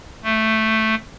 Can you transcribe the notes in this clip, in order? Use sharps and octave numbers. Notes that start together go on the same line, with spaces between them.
A3